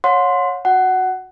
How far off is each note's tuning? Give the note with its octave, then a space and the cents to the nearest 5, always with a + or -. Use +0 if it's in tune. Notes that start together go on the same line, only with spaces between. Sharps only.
C#5 +0 F#5 -40 C6 +0
F#4 -15 F#5 +15